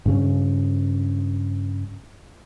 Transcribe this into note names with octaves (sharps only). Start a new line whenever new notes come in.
G2 C#3 C#4